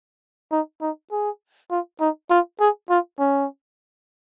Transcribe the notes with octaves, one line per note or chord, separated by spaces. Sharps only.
D#4
D#4
G#4
F4
D#4
F4
G#4
F4
C#4